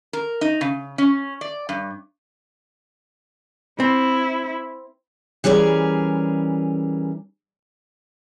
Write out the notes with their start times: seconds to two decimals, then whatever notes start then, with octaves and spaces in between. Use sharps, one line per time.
0.13 A#4
0.41 D#4
0.61 C#3
0.98 C#4
1.41 D5
1.69 G2
3.80 C4 E4
5.44 E3 G3 C#4 G#4 A#4